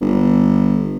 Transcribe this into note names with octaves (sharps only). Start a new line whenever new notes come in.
G1